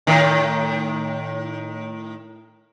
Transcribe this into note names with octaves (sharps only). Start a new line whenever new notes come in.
A2 D#3